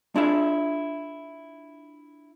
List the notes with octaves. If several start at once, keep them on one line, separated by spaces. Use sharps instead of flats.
D4 E4 F4 G#4 E5